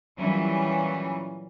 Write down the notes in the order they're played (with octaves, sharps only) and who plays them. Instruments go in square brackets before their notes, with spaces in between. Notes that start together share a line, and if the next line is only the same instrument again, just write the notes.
[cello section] A#2 E3 F#3 G3 C#4